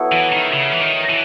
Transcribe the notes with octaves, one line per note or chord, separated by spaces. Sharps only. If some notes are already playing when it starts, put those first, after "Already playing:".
Already playing: F#3 B3 E4 A4
E3
D#3
C#3
E3
D#3
E3